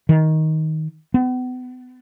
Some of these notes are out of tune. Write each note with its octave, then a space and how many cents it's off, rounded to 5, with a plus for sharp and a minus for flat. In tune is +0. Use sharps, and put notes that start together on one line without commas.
D#3 +15
B3 +35